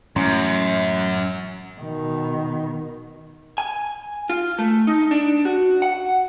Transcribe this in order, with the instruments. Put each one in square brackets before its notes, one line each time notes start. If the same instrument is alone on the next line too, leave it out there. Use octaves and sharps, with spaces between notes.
[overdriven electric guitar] F#2 [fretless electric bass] A2 E3 G#3 [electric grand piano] C#4 A#5 C6
[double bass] B2 D#3
[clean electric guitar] G#5
F4
A3
D#4
D4
F#4
F#5